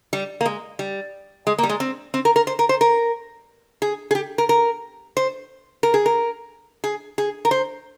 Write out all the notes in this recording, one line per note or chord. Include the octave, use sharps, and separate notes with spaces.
G3
A#3
G#3
G3
G#3
A#3
G3
G#3
C4
C4
A#4
A#4
C5
A#4
C5
A#4
G#4
G#4
G4
A#4
A#4
C5
A#4
G#4
A#4
G#4
G#4
A#4
C5